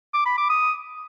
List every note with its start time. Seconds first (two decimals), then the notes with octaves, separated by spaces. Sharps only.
0.14 D6
0.26 B5
0.38 D6
0.49 D#6